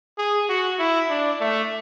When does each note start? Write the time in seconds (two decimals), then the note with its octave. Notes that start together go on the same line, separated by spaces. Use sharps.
0.18 G#4
0.49 F#4
0.79 E4
1.10 D4
1.40 A3